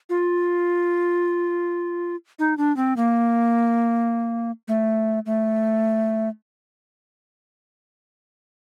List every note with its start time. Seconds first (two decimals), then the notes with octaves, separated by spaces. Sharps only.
0.10 F4
2.39 D#4
2.58 D4
2.77 C4
2.97 A#3
4.68 A3
5.26 A3